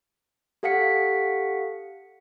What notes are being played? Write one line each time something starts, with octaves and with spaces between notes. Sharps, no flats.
G4 A4 F5 F#5 B6 C#7